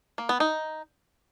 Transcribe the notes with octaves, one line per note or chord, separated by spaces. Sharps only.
A#3
B3
D#4